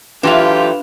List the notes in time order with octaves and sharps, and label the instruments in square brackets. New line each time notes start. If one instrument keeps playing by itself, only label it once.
[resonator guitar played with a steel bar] E3 F#3 A3 [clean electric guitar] D4 F5 [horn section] F4 G4 [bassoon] B4